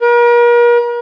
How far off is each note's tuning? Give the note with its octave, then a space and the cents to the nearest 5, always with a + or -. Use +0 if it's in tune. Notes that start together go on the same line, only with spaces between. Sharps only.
A#4 +40